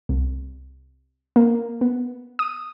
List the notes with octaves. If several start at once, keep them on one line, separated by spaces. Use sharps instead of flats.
C2
A#3
B3
D#6